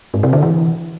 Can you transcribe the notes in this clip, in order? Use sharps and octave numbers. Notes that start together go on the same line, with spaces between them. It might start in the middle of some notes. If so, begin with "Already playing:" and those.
G#2
C3
D3
E3